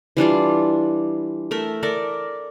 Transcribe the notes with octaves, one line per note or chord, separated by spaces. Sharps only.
E3 G3 D4 F4
A3 A#4 E5
A4 A#4 D5